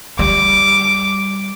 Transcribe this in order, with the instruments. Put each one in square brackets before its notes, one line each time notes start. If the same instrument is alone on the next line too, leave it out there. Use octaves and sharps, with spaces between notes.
[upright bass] G3 [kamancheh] D6